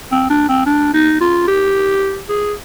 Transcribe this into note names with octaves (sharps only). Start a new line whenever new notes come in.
C4
D4
C4
D4
D#4
F4
G4
G#4